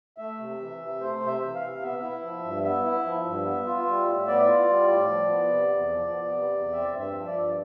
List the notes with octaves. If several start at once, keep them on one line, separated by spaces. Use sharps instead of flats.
A3 E5
C3
E3
C3
A3 C5
C3
E5
E3
F5
C3
B3 E5
E4
F3
G2
B3 E5
E4
F3
G2
B3
F4
G3
A2
B3 D5
F4
G3
A2
F3
B3
C3
E2
F3
B3
C3
E2
C4 E5
G2
E5
F3
D5
G2